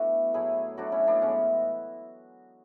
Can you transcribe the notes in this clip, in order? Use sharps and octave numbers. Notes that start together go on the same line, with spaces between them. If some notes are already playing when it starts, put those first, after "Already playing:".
Already playing: B2 A3 D4 E4 F#4
A2 F#3 A3 E4 G#4
A2 F#3 A3 D4 F#4
C#4 E4
B3 D4
A2 E3 G#3 C#4